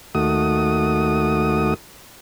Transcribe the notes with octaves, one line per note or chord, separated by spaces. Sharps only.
D#2 A3 F#4 D#6